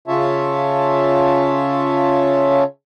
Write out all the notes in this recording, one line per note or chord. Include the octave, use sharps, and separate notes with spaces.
C#3 C#4 F4 C#5 E5 A5